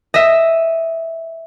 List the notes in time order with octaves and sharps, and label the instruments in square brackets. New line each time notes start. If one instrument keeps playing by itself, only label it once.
[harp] D#5 E5